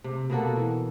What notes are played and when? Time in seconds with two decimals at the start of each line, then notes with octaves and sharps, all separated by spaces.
0.04 C3
0.30 B2 A#3 F#4 A4
0.56 E3